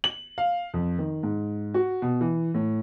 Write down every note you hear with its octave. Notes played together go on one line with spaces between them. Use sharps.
F#7
F5
F2
D#3
G#2
F#4
B2
E3
A2